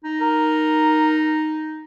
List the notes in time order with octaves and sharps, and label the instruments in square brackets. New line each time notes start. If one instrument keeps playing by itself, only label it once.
[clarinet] D#4
[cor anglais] A#4